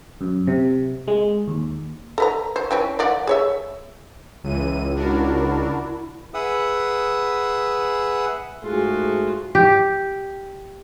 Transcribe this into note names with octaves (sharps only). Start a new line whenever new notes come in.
F#2
C3
G#3
D#2
A4 B4 A#5
C5
E3 C4 C#4
F3 D5 F#5
G#4 C#5 E5
C#2 E3 D#7
D4 E4 F#4 A#4
G#4 B4 E5 F#5 D#6
G#2 A3 F4 F#4 G#4
G4